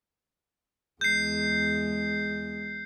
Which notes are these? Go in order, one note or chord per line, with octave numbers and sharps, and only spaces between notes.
E2 G#3 G6 C7